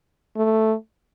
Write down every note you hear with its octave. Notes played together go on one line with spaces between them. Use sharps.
A3